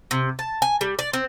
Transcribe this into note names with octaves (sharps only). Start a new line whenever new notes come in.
C3
A5
G#5
G3
D5
C4